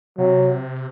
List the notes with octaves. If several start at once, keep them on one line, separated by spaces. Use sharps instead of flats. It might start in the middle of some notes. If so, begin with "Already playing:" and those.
C3 F#3